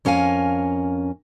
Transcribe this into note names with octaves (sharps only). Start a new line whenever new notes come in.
F2 C#4 A#4 F5 G#5